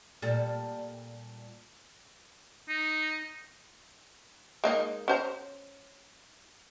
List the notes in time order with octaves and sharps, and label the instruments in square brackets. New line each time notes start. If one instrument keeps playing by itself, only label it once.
[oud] A#2 G3 A4
[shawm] D#4
[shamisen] G#3 A#3 D#4
C#4 C5 A#5